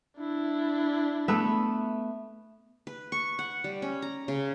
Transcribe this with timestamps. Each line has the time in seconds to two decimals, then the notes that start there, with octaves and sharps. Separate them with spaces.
0.17 D4 E4
1.28 A3 B3 E5
2.87 B4
3.12 C#6
3.39 F#5
3.64 G3
3.82 C#4
4.02 A#5
4.28 C#3